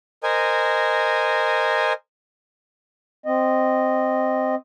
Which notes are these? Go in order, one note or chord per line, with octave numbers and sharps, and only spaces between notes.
A#4 C5 D#5 G#5
C4 D#5